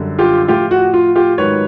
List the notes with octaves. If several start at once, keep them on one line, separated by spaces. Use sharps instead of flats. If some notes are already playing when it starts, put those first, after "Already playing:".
Already playing: F#2 D3 G3
F4 G4
A2 F3 F4 G4
F#4
F4
F4 G4
G#2 D#3 F#3 B4 C#5